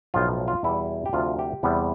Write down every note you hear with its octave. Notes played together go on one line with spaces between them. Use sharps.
B1 A2 F3 F4
F4
E2 B2 G3 E4
G4
D2 C3 F3 F4
G4
E2 C3 G3 B3